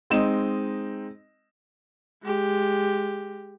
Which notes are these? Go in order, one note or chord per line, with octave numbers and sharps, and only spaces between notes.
G#3 C4 D#4 D#5 E7
G#3 G4